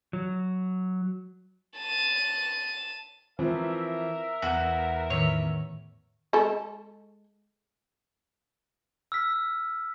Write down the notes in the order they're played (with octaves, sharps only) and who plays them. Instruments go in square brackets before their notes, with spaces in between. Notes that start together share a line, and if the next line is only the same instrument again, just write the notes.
[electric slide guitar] F#3
[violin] A5 D#7
[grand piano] E3 F3 C4 [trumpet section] A#4 E5
[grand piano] E2 [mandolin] F#4
[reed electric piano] A2 D#3 [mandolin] C#5
[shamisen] G#3 A4
[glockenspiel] E6 F6 B6